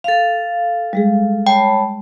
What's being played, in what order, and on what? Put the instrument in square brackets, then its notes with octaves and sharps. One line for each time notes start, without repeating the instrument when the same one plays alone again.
[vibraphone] A4 F5
[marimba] G3 G#3 G#4
[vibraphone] C#5 A5 B5 [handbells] G5